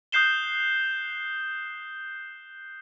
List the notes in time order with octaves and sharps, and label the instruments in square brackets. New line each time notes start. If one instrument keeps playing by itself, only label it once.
[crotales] D#6 F#6 G6 C7 E7 G7